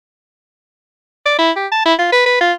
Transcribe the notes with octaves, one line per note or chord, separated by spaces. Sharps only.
D5
E4
G4
A5
E4
F4
B4
B4
F4